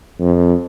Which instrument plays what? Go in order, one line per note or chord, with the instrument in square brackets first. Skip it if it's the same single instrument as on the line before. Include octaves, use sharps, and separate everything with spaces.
[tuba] F2